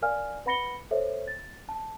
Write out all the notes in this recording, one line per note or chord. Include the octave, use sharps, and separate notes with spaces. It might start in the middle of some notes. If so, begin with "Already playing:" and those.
A#4 D5 F5 G#5 F6
B4 F#5 B5 A#6 C#7 G7
A4 C5 C#5 E5
A6
A5